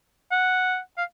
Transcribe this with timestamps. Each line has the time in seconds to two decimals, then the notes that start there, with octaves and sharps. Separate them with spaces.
0.31 F#5
0.98 F5